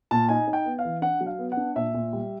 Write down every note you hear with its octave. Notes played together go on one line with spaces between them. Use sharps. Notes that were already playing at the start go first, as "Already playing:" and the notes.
A#2 A5
D#4 G#5
D#4
G5
B3
F5
E3
D4 F#5
F#3
F5
B3
F#5
D4
A#2 E5
A#2
G3